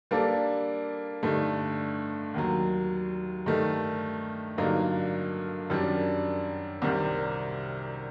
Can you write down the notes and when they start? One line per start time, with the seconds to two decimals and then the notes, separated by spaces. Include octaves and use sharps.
0.11 G3 A#3 D4 A4
1.23 G2 D3 A3 D#4
2.34 D#2 D#3 F#3
3.46 G2 D#3 A3 D#4
4.58 G2 D3 F#3 A#3 D#4
5.70 F#2 D#3 G3 D4
6.82 C2 C3 D#3 G3